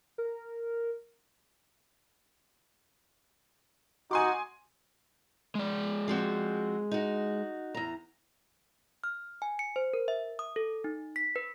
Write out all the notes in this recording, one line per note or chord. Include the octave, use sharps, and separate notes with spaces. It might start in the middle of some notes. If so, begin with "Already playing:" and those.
A#4
D#4 F#4 G#5 C6 D6
G#3 D5
F3 C4 F#4
D#4 F#4
E2 A#5
F6
G#5
C#7
C5
A#4
E5
D#6
A4
D#4
B6
B4